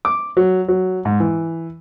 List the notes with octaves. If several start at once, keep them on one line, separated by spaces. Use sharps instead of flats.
D6
F#3
F#3
G#2
E3